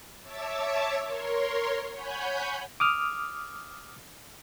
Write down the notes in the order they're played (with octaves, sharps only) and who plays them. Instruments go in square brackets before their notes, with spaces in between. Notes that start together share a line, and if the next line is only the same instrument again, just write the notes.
[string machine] C#5 E5 A5 D6 E6
A#4 C#5 C6
C#5 F#5 G#5 B5 G6
[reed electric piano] D6 D#6 F6